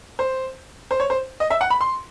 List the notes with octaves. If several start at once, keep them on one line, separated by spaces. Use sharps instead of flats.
C5
C5
C#5
C5
D#5
E5
F#5
B5
C6